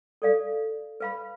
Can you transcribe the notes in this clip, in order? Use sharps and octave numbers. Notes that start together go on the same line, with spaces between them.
A4 D5 F5
B4 F5 B5